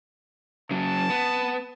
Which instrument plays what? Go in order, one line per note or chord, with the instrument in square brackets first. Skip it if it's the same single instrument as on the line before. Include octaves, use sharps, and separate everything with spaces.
[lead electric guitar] C#3 F#3 [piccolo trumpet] A5
[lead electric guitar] B3